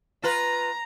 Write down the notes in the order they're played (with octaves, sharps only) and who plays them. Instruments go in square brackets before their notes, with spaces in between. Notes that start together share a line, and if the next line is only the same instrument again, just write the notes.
[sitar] F4 B4 [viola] A#5